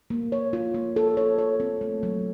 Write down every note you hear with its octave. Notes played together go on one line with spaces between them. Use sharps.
A#3
C#5
F4
A#3
A4
C#5
C#5
C4
A3
F#3